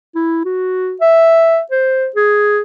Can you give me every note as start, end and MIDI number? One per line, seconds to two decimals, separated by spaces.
0.15 0.40 64
0.45 0.96 66
1.01 1.60 76
1.71 2.07 72
2.16 2.62 68